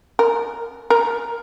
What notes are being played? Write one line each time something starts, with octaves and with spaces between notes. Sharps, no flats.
A#4
A#4